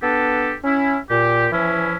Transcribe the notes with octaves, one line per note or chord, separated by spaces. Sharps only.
B3 D4 G4 A4
C#4 E4
A#2 G4
E3 F3 C#4 E4